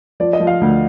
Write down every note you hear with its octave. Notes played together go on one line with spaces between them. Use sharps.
F3 D5
D#5
F3
F5
D2